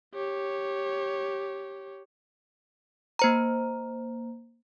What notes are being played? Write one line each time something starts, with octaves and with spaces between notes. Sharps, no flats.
G4 C#5
A#3 C5 A#5